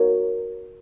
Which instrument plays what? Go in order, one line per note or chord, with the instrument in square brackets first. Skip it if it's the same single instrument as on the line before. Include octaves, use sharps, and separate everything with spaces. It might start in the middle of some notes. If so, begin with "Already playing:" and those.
Already playing: [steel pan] F#4 A#4 C#5